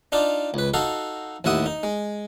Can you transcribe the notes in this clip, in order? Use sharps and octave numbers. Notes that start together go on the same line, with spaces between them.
D4 D#4 F4 D5
C#2 B4
D#4 F#4 A4 F5
A1 D#2 E4 F#5 D#6
D#4
G#3